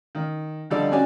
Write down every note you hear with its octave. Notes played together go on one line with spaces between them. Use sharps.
D#3
D3 F3 G3 D#4 A4 D5
C#4 F#4 G4 D5 G#5